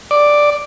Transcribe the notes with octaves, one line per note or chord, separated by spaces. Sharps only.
D5